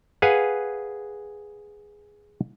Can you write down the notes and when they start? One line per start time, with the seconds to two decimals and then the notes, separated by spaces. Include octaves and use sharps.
0.22 G#4 B4 F5 F#5 G#5